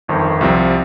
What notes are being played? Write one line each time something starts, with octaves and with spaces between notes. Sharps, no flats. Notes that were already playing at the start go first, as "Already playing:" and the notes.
G1 F2 D#3
C2 C3 F3 C4